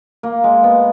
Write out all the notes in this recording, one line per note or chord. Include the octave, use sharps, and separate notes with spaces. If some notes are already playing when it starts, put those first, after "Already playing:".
A#3
G#3
B3